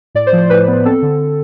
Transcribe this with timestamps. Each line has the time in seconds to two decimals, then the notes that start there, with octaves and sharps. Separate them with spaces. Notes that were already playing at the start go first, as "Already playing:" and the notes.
0.15 A2 D5
0.27 C5
0.33 F3
0.38 C5
0.50 A2 B4
0.68 B3
0.85 C4 A4
1.02 D3